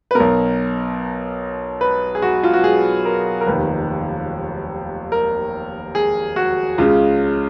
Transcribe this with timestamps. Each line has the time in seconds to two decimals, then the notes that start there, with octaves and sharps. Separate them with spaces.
0.11 B4
0.15 B1 B2 A#4
1.81 B4
2.15 G#4
2.22 F#4
2.43 F4
2.54 F#4
2.64 G#4
3.05 A#4
3.41 A#4
3.47 F1 D#2 D#3 B4
5.12 A#4
5.95 G#4
6.36 F#4
6.78 C#2 C#3 F4